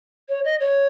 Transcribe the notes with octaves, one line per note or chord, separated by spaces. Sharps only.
C#5
D#5
C#5